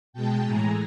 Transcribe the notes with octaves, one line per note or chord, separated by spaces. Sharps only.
B2 G#3 G5 A5
A2 E3 G#3 G#5 A#5